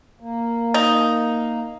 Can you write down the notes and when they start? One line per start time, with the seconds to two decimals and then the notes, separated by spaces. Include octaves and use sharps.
0.20 A#3
0.74 D#4